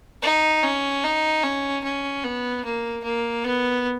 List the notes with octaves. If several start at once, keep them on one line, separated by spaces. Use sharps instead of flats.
D#4
C#4
D#4
C#4
C#4
B3
A#3
A#3
B3